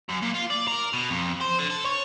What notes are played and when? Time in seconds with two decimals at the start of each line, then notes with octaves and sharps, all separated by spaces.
0.09 F#2
0.22 A#2
0.34 F4
0.50 D5
0.68 A#4
0.93 B2
1.10 F2
1.41 C5
1.59 D3
1.70 A4
1.85 C#5